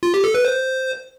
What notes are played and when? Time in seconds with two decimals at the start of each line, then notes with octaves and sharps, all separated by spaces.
0.03 F4
0.14 G4
0.24 A4
0.35 B4
0.45 C5